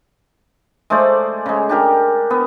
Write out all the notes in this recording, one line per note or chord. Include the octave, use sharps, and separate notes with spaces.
G#3 A3 C5 D5
C#3 G#3
D4 G4 A#4
B3